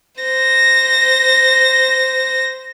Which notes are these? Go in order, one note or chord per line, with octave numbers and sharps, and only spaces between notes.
C5 A#6